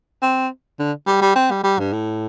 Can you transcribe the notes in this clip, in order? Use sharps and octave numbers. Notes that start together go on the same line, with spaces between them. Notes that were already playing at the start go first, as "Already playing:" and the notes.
C4
D3
G3
G3
C4
G3
G3
G2
A2